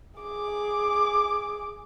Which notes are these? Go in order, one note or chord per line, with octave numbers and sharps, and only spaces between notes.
G#4 D6